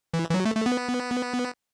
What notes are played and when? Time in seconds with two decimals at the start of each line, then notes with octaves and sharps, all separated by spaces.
0.14 E3
0.29 E3
0.34 F#3
0.45 A3
0.56 A3
0.66 B3